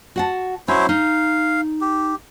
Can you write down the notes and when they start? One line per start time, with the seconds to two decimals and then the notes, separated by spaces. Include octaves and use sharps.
0.16 F#4 F#5 A5
0.68 F#3 C#4 E4 C5
0.89 D#4 F5
1.81 G4